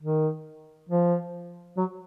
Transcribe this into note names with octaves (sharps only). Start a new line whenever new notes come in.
D#3
F3
F#3